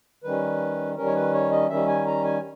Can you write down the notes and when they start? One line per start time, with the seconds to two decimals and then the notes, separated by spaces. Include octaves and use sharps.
0.24 D#3 G3 C#4 B4
0.97 D#3 G3 C#4 A#4
1.06 C#5
1.15 B4
1.34 C#5
1.51 D#5
1.69 D#3 G3 C#4 E5
1.88 G#5
2.06 A#5
2.24 G#5